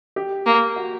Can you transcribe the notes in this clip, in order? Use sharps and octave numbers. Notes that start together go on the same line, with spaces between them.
G4
A#3
F#4